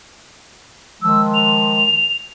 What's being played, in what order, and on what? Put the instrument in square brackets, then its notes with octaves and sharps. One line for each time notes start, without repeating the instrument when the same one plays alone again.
[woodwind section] D#3 F3 G#3 [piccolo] E6
[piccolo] F7